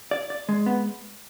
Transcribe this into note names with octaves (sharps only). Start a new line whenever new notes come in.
D5
D5
G#3
B3